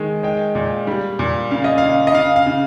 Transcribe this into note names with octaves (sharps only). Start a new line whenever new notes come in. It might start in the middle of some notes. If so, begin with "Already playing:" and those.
Already playing: D#3 G#3
G#3 G5
A#2
G3
A#2
C#3 F5
D#5
F5
C#3
D#5
C#3 F5
F5
C#3